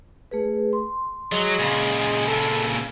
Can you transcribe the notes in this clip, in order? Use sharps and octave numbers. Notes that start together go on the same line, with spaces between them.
A3 G#4 B4
C6
F#3 G#3
A#2 C#3
A4